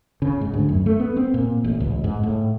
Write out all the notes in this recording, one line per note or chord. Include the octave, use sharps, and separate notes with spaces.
C#3
G#2
D2
F#2
A3
B3
C4
A#2
A1
C#2
G#2
A2